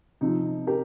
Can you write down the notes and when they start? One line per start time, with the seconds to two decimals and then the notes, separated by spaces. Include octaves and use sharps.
0.21 C3 F3 D#4
0.67 G4 A#4